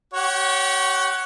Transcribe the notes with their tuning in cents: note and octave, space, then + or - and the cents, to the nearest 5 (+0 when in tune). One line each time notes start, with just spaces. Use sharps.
G4 -30 C#5 +0 F#5 +5